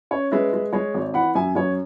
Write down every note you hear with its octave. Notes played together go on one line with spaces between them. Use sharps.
C#4 C#5
G#3 B4 E5
G#3
G#3 C#5
G#1
E3 F#5 B5
F#2 E5 G#5
F#2 C#5